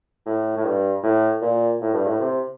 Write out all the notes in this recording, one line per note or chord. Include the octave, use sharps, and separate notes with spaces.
A2
A2
G2
A2
A#2
A2
G2
A2
C3